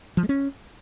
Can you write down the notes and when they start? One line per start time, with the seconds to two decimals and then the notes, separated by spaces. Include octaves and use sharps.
0.17 F3
0.23 G#3
0.29 C#4